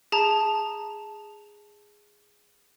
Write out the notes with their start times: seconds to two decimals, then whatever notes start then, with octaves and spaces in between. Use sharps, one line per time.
0.12 G#4 A5 A#5